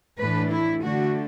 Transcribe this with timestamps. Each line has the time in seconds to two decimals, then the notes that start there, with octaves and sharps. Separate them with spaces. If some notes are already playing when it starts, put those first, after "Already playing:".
0.18 A2 E3 A3 D4 B4
0.50 E4
0.82 D3 A3 D4 F#4